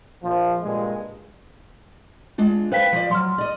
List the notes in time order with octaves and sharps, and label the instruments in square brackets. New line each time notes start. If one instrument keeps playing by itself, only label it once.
[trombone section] A#1 F3
G2 A#2 G#3
[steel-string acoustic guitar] G#3 D4 F4
[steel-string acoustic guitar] B4 G5 A5 [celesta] C5 F5 B6
[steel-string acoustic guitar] F3 D5
[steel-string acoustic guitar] F#3 [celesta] C6 F6
[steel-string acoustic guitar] D5 D#5